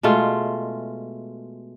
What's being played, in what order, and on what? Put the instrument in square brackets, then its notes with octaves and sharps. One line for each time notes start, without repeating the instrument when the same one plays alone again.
[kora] B2 G#3 A3 F4